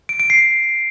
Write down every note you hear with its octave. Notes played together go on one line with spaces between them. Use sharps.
D7
D7
C7